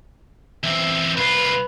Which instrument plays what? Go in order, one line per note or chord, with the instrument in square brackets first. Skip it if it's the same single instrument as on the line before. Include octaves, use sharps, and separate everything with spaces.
[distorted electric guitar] E2 C4 [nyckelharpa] E5
[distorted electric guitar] C2 F4 [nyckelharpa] B4